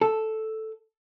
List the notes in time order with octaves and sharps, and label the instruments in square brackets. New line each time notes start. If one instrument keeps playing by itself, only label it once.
[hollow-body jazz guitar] A4